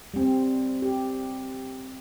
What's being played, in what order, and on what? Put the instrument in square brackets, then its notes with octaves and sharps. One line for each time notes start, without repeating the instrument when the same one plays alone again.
[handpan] G3 C4
G4